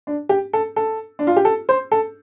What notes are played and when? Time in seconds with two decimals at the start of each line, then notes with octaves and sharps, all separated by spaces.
0.07 D4
0.29 G4
0.53 A4
0.76 A4
1.19 D4
1.27 F4
1.36 G4
1.45 A4
1.69 C5
1.91 A4